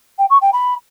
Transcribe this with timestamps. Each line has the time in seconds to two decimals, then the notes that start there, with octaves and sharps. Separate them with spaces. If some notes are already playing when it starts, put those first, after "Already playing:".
0.19 G5
0.30 C#6
0.42 G5
0.53 B5